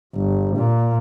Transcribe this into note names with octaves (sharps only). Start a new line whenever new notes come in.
G1
A#2